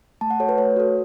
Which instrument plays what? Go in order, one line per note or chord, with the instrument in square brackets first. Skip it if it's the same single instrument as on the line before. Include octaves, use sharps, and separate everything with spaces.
[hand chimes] A3 A5
F#5
F#4 A4 C#5
B4
A3 C#5
F#4 A4